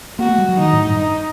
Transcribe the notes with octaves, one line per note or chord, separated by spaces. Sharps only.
A#3 F#4
A3
G3
F#3
D#3 D#4
A2
G2
D#4